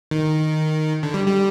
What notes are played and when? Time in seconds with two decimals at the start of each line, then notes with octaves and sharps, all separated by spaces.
0.11 D#3
1.03 D3
1.14 G3
1.27 G3